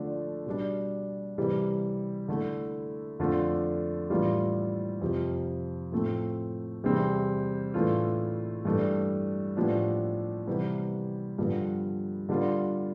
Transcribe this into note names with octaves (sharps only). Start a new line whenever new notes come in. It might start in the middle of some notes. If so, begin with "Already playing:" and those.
Already playing: D3 F3 A3 D4
B2 G3 D4
C3 E3 G3
D3 A3 E4
F2 D3 A3 D4 F4
A2 E3 G3 D4 F4
F2 C3 F3
A2 F3 A3 C4
E2 C3 G3 C4
A2 E3 A3 D4 F4
G2 E3 A3 D4
A2 F3 B3 D4 G4
C3 E3 G3 B3
G2 D3 F3 B3
D3 G3 B3 D4 F4